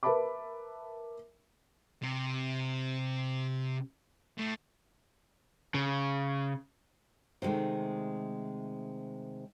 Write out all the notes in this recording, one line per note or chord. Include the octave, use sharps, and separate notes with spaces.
A#4 B4 E5 A5 B5 D6
C3
A2
C#3
C3 D#3 F#3 G#3 A3